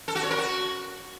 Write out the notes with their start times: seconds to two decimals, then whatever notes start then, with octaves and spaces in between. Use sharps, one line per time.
0.08 A4
0.15 F#4
0.23 C#5
0.31 A#4
0.38 F#4